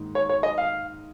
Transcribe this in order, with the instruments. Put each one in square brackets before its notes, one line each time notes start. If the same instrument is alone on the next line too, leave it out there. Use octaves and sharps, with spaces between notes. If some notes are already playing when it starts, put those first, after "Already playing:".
Already playing: [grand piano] G#2 D#3 A#3 D#4
[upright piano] C#5
C#5
D#5
F5